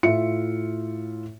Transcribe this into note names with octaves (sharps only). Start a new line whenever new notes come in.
A2 F4 E5 C#7